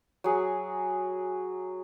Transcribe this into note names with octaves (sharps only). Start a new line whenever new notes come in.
F#3 G#4